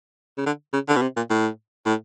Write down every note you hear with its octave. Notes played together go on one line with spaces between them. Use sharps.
C#3
D3
C#3
D3
B2
C3
A#2
A2
A2